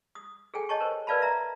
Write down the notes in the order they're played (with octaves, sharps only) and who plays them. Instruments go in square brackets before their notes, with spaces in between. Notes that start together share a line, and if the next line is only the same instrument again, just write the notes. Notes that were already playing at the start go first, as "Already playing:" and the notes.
[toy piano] D#6
G#4 A4 G5 G#5
C#5 D#5 A5 C#6
A#4 C5
A#4 B4 D5 F5 A5 B5
E5 A#5